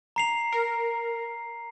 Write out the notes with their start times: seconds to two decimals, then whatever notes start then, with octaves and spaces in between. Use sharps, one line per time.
0.16 A#5 C7 F7
0.52 A#4